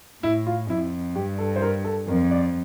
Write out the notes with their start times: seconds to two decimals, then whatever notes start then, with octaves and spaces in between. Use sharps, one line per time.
0.23 A2 E4
0.47 F4
0.69 F2 E4
1.16 G2 G4
1.38 A4
1.56 C5
1.62 A#4
1.85 A4
2.08 F2 A#4
2.31 D5